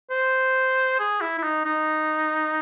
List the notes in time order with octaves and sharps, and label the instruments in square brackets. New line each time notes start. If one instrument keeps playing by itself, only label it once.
[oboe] C5
G#4
E4
E4
D#4
D#4